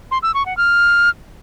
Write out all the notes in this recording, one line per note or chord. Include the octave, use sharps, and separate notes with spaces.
C6
E6
C#6
F#5
F6